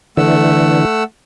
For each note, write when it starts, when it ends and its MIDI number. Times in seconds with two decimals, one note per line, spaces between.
0.17 0.85 50
0.17 0.85 52
0.17 1.03 57
0.17 1.03 78
0.17 1.03 88